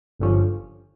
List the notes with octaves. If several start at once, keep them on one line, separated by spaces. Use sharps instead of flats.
G1 G2 D3 F3 C#4